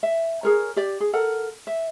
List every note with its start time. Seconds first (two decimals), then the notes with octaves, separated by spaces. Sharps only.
0.03 E5
0.43 G#4 A#4 C#5
0.76 G4 D5
1.00 G#4
1.13 A4 A#4 F#5
1.67 E5